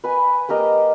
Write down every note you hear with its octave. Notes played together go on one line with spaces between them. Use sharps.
B4 G#5
A#3 G4 A#4 D#5